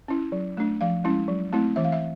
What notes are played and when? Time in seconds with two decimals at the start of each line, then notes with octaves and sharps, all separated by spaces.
0.08 C#4 E4
0.32 F#3
0.57 A3 D4
0.81 F3 F5
1.04 G#3 C#4 E4
1.28 F#3
1.52 A3 C4 E4
1.76 E3 E5
1.84 F5
1.92 E5